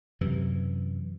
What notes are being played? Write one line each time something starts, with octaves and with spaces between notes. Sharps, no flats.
F#2 C3 E3